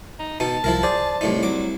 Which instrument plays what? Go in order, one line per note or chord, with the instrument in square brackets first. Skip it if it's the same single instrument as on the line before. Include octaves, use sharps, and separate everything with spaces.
[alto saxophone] D#4
[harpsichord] B2 D#4 [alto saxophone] A5
[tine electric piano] C2 [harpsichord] F3 E4 A#4
[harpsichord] G#4 [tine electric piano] C5 D5
[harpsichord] C2 A2 D#4
[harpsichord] C2 D6 [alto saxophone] F#3